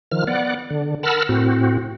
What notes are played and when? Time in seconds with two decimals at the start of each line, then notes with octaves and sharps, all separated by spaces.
0.12 D#3 F3 F6
0.27 B3 D5 F#5
0.70 D3
1.03 A#4 F#5 A5 B5 E6 F6
1.29 A2 C4 F#4